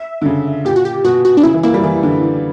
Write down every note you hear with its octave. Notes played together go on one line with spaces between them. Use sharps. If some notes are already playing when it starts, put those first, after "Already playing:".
Already playing: E5
D3
C#3
A#2 G4
F#4
G4
B2 F#4
F#4
D4
C#3 E4
E3
A#3 E4
G3
E3
D3